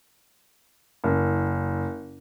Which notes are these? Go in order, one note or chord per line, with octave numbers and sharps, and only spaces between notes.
F#1